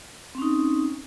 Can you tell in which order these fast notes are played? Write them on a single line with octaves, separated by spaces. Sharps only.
C4 C#4 D#4